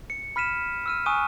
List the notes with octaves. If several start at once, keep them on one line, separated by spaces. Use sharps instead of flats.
C#7
B5 F6 B6 D#7 E7
E6 F6 D#7
G#5 C#6 D#6 F#6 D#7